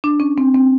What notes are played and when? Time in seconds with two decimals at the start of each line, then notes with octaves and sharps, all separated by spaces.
0.04 D4
0.20 C#4
0.38 C4
0.55 C4